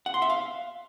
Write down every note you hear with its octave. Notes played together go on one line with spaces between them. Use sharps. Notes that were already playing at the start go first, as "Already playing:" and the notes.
F#5
C6
E5
F5